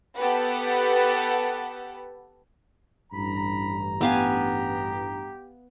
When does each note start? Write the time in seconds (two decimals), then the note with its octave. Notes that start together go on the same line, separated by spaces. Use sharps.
0.17 B3 G4 A4 B4 F#5
3.12 A1 G2 A#5 B5
4.01 B3 G4 F5 G#5